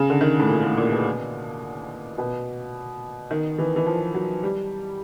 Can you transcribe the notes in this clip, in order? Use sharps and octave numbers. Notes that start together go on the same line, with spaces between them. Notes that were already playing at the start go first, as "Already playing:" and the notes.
Already playing: C#3
D3
D#3
A2
A#2
A2
A#2
B2
B2
D#3
E3
E3
F3
F#3
G3